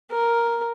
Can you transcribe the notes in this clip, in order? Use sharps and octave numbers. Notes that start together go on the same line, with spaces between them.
A#4